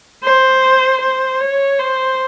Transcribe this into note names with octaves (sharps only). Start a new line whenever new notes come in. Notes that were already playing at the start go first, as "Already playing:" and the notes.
C5
C5
C#5
C5